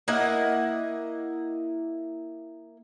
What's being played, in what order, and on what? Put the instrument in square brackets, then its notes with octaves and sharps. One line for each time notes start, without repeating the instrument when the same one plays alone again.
[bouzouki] A#3 E4 D#5 F#5